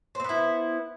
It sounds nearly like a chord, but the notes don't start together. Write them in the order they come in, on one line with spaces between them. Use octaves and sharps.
C5 C4 B3 E4